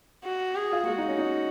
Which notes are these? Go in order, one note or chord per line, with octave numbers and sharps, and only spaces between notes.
F#4
G#4
F4
A#3
G#3 F#4
D#4
C#4
D#4